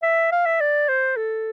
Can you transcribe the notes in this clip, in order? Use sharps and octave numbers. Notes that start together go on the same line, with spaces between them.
E5
F5
E5
D5
C5
A4